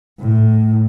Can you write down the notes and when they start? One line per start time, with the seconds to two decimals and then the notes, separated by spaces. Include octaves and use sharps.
0.20 A2